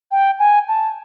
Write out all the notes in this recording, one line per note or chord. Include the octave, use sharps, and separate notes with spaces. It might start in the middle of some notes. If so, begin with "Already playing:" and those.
G5
G#5
A5